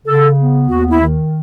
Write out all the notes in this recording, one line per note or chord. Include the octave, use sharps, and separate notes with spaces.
C#3 A4
B3
D#2 F#4
E4
D#3